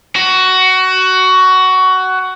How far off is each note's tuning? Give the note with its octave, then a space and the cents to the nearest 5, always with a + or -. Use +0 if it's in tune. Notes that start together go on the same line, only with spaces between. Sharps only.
F#4 +15